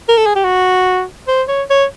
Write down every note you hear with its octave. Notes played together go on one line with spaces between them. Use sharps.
A#4
A4
G#4
G4
F#4
C5
C#5
C#5